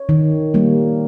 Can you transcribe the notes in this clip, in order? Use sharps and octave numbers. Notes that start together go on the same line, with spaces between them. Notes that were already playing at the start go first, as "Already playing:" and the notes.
Already playing: C#5
D#3
G3 A#3